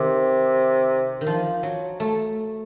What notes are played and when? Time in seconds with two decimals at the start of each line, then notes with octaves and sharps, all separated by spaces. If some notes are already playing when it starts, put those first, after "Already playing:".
Already playing: C3 D#3
1.21 D#3
1.27 F3
1.63 F#3
2.00 A3